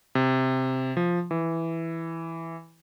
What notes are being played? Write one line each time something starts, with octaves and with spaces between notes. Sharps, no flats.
C3
F3
E3